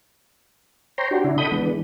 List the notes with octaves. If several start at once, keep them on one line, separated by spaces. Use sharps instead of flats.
C5 C#5 G5 A#5 C6
D4 F#4 G4
C#3 D4 E4
A4 D#5 F#5 B5 D#6 G6
E3 G#3 B3 D4
E3